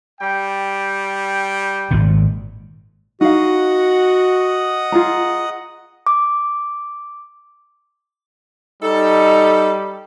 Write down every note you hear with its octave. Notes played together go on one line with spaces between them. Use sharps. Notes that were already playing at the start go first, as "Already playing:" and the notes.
G3 G5
G#1 A#2
D#4 F#4 D#5 F5 F#5 D#6
F4 G#4 A#5
D6
G3 D#4 A4